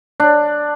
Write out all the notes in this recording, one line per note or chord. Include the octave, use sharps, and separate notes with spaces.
D4